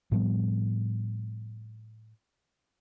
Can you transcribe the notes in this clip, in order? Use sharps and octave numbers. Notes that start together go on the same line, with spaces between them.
A2 F3 G3 B3